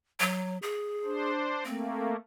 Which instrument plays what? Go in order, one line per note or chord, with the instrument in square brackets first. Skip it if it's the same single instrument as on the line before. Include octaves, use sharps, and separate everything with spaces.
[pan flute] F#3
G#4
[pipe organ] D4 C5
[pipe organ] A3 A#3 [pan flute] C4